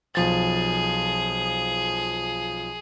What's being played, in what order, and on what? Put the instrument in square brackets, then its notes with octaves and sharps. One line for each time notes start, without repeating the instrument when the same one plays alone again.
[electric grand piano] B1 F3 A6 [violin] G#4